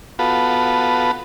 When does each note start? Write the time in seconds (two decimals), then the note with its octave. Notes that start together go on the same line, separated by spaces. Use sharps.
0.19 B3 F4 F#4 A4 B4